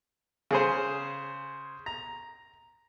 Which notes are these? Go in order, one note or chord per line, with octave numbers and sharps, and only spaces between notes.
C#3 G#4 C5
A#5